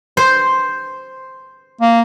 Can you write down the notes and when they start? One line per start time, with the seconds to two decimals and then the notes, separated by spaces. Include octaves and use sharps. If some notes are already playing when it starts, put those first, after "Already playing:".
0.17 C5
1.81 A#3